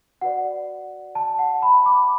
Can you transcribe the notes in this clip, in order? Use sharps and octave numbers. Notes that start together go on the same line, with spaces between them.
F#4 B4 D5 F#5
A5
F#5
B5
D6